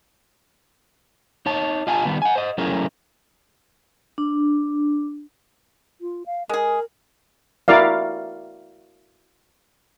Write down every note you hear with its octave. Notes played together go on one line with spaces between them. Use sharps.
D#4 C#5 A5
F4 D#5 F5 G#5 A5
D#3 G3 B3
F#5 G#5
C5 D#5
F#3 A3 C#4 E4 G#4 A#4
D4
F4
F5
G#3 G#4 A#4
E4 F#4 A#4 D5 F5